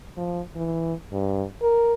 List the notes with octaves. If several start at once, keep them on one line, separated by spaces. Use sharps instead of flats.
F3
E3
G2
A#4